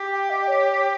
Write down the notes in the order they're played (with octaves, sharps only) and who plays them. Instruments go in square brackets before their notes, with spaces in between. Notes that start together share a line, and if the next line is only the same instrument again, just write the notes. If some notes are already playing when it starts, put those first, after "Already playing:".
Already playing: [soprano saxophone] G4
[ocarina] G5
D#5
D#5
C#5